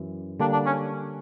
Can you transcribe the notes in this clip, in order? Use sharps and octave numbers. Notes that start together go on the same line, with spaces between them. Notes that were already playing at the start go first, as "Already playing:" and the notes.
Already playing: F#2 E3
D3 G3 A#3 D4
D4
C#4